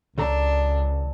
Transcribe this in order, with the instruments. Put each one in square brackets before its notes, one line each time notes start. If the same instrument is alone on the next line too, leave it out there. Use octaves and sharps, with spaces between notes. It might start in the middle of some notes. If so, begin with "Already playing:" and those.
[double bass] C#2 [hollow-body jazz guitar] C#3 A4 A#5 [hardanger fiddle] D4